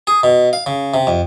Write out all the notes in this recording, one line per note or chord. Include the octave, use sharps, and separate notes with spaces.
G#4
B2
F5
C#3
C3
F2